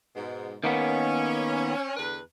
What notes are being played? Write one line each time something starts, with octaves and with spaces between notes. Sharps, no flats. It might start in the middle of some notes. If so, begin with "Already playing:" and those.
G#2 B2
D#3 A#3 B3 C#4
E2 D3 B4